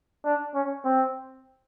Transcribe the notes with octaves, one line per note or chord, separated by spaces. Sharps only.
D4
C#4
C4